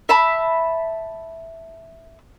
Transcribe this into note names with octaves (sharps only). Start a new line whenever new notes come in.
E5 A5 B5